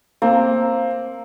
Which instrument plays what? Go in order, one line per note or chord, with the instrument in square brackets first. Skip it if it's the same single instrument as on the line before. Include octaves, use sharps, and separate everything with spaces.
[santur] A#3 [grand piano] C4